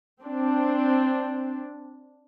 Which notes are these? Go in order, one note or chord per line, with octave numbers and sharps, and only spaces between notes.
C4 D4